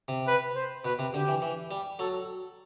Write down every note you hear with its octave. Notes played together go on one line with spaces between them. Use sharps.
C3
B4
C5
B2 B4
C3
D3 G4
E3
E3
G3
F#3 A4